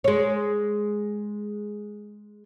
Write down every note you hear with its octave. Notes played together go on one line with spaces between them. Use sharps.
G#3 C#5